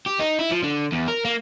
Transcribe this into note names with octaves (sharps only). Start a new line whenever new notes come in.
G4
D#4
E4
F3
D3
E2
A#4
A#3